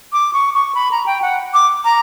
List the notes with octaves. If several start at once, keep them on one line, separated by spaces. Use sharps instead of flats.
D6
C#6
C#6
B5
A#5
G5
F#5
D6
A#5